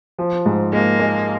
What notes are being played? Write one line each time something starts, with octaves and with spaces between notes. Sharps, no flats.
F3
G#2
G#3 A#3
G#3